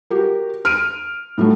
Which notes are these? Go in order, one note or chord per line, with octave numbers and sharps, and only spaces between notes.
F#4 G4 A#4
F6 D7 D#7
A2 F#3 A3